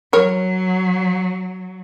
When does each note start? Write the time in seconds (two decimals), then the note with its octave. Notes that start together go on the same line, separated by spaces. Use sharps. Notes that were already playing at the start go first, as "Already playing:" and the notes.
0.13 F#3 A#4 C#5